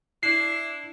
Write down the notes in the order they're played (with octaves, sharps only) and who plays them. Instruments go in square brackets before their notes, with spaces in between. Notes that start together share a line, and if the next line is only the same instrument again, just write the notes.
[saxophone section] D4 E4 [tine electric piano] C7